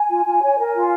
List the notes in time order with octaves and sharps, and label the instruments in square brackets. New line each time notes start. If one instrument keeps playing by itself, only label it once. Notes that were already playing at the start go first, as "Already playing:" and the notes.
Already playing: [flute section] G#5
F4
F4
C#5
A#4
F4